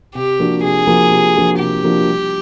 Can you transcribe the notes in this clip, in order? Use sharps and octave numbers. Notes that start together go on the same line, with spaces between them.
C3 G4
F3 A#3 D4 F#4
C3 G#4
F3 A#3 D4 F#4
C3
F3 A#3 D4 F#4
C3 G4
F3 A#3 D4 F#4
G3